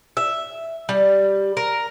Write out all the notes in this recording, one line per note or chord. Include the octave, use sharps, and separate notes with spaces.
E5
G3
A#4